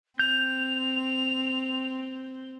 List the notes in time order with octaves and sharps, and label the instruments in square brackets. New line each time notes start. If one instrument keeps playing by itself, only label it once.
[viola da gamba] C4 [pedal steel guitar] G6 [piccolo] F7